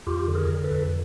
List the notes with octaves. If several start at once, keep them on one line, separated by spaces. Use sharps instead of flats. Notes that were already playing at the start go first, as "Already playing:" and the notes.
F2 F4 G4
D3
G#4 A#4
D3
A4 B4
F2